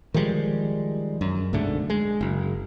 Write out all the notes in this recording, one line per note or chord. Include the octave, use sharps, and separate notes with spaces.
D#3 F3 G3 G#3
F#2
B1 G#2 D3 A3
G#3
F#1